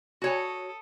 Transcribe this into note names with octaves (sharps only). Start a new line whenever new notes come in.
F#4 A4 C#5 G#5 D#6